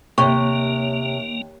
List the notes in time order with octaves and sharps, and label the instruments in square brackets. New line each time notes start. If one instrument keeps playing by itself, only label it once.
[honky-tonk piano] D#2 C#5 F#6 [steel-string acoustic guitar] C3 [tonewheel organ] A#3 [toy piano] C#6